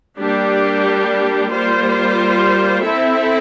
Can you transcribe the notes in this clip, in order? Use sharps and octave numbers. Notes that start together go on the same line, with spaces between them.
G3 A#3 D4 G4
G3 A#3 F4 C5
C4 E4 A4 E5